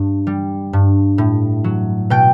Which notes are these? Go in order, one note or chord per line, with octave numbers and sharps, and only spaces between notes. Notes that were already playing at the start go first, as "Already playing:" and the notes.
Already playing: G2
G3
G2
A2
F#3
B2 G5